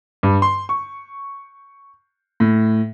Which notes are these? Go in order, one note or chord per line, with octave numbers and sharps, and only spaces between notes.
G2
C6
C#6
A2